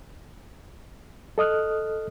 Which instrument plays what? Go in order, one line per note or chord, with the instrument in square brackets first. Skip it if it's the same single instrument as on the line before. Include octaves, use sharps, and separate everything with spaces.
[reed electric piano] A4 D#5 D#6 F6 F#6